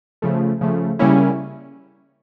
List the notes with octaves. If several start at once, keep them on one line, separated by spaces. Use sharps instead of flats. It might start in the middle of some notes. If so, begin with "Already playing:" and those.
C#3 F3 A3
C#3 F3 A3
C#3 G3 A#3 C#4 E4